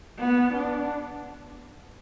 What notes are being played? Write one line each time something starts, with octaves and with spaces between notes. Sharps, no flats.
B3
D4